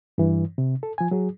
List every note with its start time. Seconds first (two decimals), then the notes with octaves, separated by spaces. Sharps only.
0.18 G2 E3
0.58 C3
0.83 A4
0.98 F3 G#5
1.11 F#3 G#4